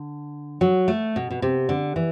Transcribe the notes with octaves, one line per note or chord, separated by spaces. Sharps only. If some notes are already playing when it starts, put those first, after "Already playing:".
Already playing: D3
F#3
A3
B2
B2
C3
D3
E3